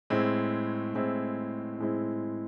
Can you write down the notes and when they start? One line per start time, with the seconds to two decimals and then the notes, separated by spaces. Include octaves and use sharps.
0.10 A2 G#3 C4 E4
0.94 A2 G#3 C4 E4
1.79 A2 G#3 C4 E4